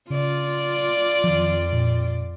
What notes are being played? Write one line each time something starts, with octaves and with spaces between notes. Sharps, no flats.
C#3 F4 D5
F2 D#3 F3
A#2